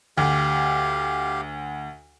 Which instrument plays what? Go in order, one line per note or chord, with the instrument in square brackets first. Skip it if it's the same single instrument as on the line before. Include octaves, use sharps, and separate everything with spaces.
[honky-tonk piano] D2 [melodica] G4 F5